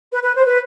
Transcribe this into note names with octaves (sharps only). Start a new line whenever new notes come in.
B4
B4
C5
B4